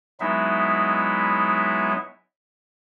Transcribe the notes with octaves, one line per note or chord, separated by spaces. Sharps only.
F#3 G#3 B3 D#4 E4 E5